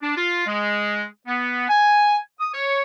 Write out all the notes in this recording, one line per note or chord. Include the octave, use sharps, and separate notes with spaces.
D4
F4
G#3
B3
G#5
D#6
C#5